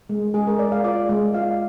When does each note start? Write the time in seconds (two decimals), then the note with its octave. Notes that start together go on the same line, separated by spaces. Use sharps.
0.09 G#3
0.34 G#3 G#4
0.47 A#4
0.59 G#3 D5
0.72 F5
0.84 F4 D5
1.09 G#3
1.34 F4 F5